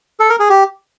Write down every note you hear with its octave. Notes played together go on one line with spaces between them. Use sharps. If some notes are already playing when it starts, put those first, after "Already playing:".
A4
A#4
G#4
G4